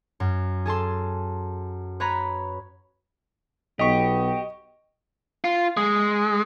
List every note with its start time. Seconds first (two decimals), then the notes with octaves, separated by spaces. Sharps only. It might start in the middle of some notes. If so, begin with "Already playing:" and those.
0.20 F#2
0.65 G#4 A4 A5 C6
2.00 B4 C#5 A#5 B5
3.79 B1 B3 G4 D#5 C#6
5.44 F4
5.77 G#3